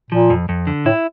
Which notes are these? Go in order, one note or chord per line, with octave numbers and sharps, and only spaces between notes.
A#2 F3
F2
F2
D3
A2 E4